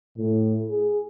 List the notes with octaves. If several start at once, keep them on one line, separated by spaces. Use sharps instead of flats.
A2
G#4